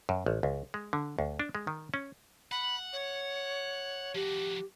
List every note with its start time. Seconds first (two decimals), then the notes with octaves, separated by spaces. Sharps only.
0.09 F#2
0.26 A1
0.43 C#2
0.74 G#3
0.93 D3
1.19 D2
1.39 D4
1.55 G#3
1.67 D#3
1.94 C#4
2.51 F#5 B5
2.93 C#5
4.15 F3 F#4 G4